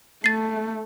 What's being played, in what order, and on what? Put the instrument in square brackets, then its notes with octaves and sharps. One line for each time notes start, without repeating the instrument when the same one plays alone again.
[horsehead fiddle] A3 [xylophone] A6 C7